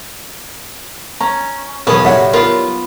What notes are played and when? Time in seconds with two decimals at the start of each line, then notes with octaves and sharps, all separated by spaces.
1.21 C#4 A#5
1.87 B1 E2 C#3 B3 A#4 C#5 D#6
2.05 A2 F#3 G3 E5 F#5
2.33 B3 F4 A#4 F5